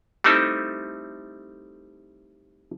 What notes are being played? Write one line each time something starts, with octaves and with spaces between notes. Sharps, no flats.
G3 A3 C4 D#4 E4 A4